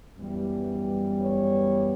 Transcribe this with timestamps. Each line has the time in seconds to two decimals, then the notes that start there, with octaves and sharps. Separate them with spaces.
0.17 F#2 E3 G3 B3
1.19 C#5